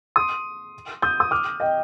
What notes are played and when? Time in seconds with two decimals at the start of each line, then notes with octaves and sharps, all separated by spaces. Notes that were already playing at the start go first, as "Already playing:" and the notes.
0.16 C6 D#6
1.02 D#6 G6
1.20 D#6
1.31 D6 F6
1.60 D#5 G5